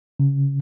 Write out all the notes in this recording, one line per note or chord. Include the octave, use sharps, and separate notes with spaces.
C#3